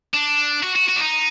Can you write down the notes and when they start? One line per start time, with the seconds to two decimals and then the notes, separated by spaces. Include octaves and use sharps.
0.14 D4
0.63 F#4
0.76 F#4
0.89 F#4
0.97 D4
1.01 D#4